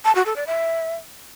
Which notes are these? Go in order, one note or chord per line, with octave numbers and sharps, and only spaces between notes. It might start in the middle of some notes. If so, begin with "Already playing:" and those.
A5
F#4
A4
D5
E5